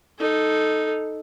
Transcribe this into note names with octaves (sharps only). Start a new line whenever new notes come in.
D#4 A4